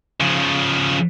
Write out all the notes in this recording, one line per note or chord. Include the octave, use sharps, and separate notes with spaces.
C#3 F3